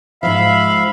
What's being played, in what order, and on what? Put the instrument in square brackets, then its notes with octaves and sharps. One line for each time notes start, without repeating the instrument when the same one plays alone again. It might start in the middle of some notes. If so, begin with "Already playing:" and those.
[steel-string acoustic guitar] G#2 F3 [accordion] E5 F5 B5